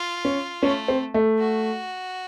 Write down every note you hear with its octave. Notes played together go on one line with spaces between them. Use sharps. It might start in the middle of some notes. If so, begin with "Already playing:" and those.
Already playing: F4
C#4
A3 C#4
C4
A3
F#4